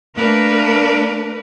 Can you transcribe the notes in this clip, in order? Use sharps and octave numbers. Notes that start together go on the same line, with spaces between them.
A3 A#3 D4 A#4 B4